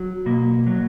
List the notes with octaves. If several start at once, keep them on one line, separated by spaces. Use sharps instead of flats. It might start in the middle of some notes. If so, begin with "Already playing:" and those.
Already playing: F#3
B2 A#3
F#3